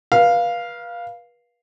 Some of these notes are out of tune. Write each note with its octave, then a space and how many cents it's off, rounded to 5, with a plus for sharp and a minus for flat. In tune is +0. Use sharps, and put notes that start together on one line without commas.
B4 -35 F5 +0